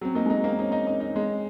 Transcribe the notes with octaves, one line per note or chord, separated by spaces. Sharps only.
F#3 C4
A#3 D#4
G#3
A#3 D#4
A#3 C4
C#4 D#4
D#4
D#4
D#4
G#3